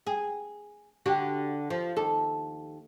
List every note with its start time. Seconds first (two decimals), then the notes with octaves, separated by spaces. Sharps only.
0.07 G#4
1.06 D3 F#4 G4
1.70 F3
1.96 D#2 A4